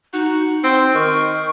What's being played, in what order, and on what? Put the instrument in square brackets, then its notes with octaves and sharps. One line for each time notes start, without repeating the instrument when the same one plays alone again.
[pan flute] D#4 [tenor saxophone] F#4
[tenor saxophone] C4 [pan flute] C6
[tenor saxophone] D#3 [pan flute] C#6